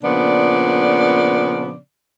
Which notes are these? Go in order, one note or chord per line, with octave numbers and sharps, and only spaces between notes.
A#2 C#3 F3 B3 D4 D5